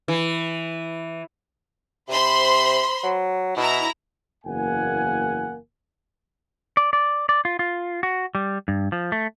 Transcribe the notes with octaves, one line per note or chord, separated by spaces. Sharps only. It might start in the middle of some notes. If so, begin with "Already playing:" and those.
E3
C3 C5 B5 C6
F#3
B2 E4 A#5
F#1 E2 A#3 F#5 G#5
D5
D5
D5
F4
F4
F#4
G3
G2
F3
A3